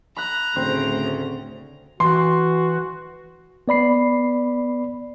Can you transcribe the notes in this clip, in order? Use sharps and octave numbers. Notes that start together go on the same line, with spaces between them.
A#5 B5 F#6
D2 A2 C#3 C4
E3 F#4 C6
B3 D5 B5 C7